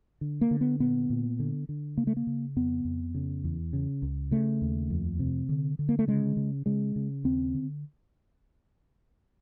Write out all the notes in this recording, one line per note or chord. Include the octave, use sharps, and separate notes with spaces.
D3
A#3
D3
B3
A#2 B3
A#2
D3
D3
C#3 A#3
A3
A#3
C#3
F2 B3
F2
C#3
E2
C#3
C#2
C#3 A3
D#2
F2
C3
D3
D3
A#3
A3
C#3 G#3
C#3
C#3 G#3
C#3
D#2 C4
D3